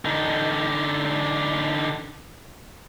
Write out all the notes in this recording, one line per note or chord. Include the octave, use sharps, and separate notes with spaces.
D3 D#4